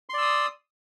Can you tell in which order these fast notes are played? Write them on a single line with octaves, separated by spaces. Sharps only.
C6 D5 E6 D#6